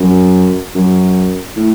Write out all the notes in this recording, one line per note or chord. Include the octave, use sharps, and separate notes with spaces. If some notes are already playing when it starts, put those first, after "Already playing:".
Already playing: F#2
F#2
A2